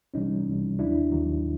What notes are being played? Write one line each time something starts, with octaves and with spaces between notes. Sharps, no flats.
C2 C3 E3 G3 C#4 D#4
C2 C3 E3 G3
D#2 D#3 F#3 D4 E4
D#2 D#3 F#3